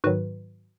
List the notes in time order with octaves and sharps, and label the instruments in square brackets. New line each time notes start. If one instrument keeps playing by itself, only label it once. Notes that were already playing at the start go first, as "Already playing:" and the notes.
[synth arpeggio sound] G#2 D#3 F#3 F#4 B4